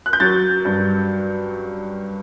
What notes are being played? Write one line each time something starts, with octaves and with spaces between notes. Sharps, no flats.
F#6
G6
F#3 A6
G2